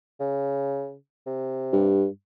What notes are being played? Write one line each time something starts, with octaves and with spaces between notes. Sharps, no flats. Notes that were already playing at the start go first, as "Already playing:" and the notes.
C#3
C3
G2